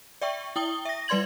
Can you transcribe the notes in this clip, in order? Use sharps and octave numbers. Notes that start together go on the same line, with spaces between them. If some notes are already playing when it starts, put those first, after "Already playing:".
D5 E5 G5 C#6
E4 G5 D#6 G7
E5 A#6
G3 B4 D5 C6 G#6 F#7